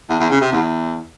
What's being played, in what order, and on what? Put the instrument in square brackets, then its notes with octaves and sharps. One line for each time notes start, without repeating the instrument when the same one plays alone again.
[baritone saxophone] E2
E2
C#3
C3
E2